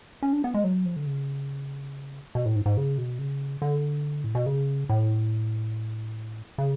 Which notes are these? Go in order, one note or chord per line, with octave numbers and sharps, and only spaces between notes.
C#4
D4
B3
G#3
F#3
F3
D3
C#3
B2
A2
G#2
G#2
C#3
B2
C#3
D3
A2
B2
C#3
A2
C#3